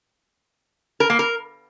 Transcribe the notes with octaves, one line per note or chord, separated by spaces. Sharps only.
A#4
A#3
A#4